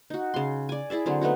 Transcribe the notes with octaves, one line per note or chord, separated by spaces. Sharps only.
D#4 F#4
C#3 C6
D5 G#5
E4 G#4 D5 E5
D3 F#3 C4
A3 B3 D#4 F#4